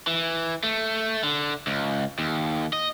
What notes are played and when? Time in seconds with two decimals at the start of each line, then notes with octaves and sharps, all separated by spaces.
0.07 E3
0.63 A3
1.24 D3
1.67 C#2
2.19 D#2
2.73 D#5